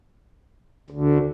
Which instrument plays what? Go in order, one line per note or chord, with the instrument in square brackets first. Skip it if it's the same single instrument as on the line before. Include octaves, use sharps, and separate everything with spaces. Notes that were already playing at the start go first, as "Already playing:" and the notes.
[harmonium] D2